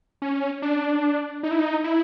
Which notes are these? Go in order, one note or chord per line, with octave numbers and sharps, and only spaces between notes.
C#4
D4
D#4
E4
D#4
E4